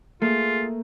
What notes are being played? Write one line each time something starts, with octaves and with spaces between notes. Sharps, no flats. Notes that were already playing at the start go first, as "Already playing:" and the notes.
A3 A#3 F4 G#4